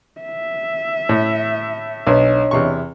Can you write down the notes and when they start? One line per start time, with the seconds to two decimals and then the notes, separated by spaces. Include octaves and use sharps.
0.21 E5
1.09 A2
2.07 B1 D4 C#5 D#5
2.51 E2 C3 C#6